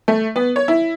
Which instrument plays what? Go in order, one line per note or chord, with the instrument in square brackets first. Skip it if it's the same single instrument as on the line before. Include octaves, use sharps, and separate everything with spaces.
[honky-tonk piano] A3
B3
C#5
E4